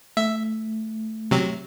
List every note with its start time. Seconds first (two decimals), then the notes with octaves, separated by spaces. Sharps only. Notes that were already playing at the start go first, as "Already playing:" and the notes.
0.17 A3 E5
1.31 C3 F#3